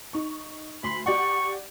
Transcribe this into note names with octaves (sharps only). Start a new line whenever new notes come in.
D#4 C#6
D2 B5 C6 C7
G4 D5 F#5 C#6